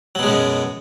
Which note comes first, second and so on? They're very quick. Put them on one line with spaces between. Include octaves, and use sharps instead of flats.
F#3 B2 G#3 F#2